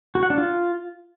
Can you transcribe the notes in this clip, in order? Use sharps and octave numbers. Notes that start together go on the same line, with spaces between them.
F#4
F#5
D4
F4